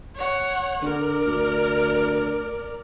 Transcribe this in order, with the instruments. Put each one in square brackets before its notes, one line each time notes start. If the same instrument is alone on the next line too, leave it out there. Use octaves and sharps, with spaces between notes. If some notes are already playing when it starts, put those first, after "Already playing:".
[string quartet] C#5 F#5
[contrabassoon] D3 [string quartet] A#4 D5
[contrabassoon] D2